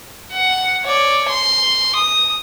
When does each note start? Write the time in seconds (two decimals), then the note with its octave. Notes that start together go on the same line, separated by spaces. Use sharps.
0.32 F#5
0.84 C#5 D5
1.29 C6
1.96 D#6